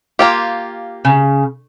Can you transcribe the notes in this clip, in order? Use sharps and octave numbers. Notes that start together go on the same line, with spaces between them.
A#3 F4 G4
C#3